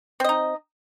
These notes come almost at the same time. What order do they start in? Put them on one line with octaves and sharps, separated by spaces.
C4 D#5 D#4